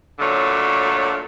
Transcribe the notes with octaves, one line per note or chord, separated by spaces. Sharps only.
A#2 D3 F#3 A3 C#5